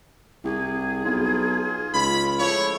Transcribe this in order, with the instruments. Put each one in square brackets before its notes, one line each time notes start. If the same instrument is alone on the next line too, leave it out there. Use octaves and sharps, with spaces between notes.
[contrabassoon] C2 [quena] G#4
[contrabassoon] B1 [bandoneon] F4
[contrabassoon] C#2 [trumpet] B5
[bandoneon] F3 A3 E4 [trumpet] C#5